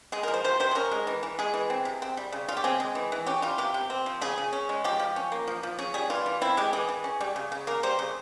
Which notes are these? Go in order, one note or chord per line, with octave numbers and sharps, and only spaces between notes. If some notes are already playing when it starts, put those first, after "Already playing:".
G#3 G#4
F3 A#4
C5
C3 C5
C3 C5
G#4
C#4 A#4
G#3
E3
E3
G#3 G#4
E3
C4
C3
C4
G3
C#3
C#3 F4
G4
C4 G#4
G#3
E3
E3
C#4 G4
G3 F4
C3 G4
C3
C4
F3
C#3 G#4
C#3
C#4
G#3
F3 G4
F3
C#4
A#3
F3
F3
C#4 G#4
G3 G#4
E3 F4
E3
C4 E4
G#3 G4
E3 G#4
E3
C#4
G3
C#3
C#3
A#3 A#4
G3 C5
C#3